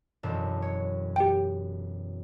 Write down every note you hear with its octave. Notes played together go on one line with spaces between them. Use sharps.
E1 F#2 A4
C#5
G4 G5